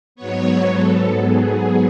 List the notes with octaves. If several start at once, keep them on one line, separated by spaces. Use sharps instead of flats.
G#2 F#3 B3 C#5
A4
G#4